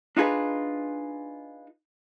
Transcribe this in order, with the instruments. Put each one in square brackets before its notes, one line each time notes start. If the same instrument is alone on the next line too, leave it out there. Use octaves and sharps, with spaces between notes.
[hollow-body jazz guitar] D4 D#4 F4 G#4 B4